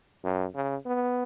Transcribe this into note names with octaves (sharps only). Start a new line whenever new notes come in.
F#2
C#3
B3